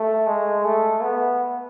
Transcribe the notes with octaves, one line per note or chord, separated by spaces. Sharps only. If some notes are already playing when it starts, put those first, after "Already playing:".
Already playing: A3
G#3
A3
B3